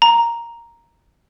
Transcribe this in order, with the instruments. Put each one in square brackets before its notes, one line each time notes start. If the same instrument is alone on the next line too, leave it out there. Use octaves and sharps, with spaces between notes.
[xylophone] A#5